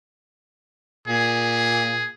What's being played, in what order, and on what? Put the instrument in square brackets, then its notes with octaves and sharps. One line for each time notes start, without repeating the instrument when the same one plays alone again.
[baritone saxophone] A#2 [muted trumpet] G#4